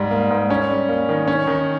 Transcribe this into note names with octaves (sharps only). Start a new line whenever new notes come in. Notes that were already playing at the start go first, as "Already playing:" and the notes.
Already playing: G#2 G3
A#3
G#2
C#4
G3
A#3
D#3
C#4
D#3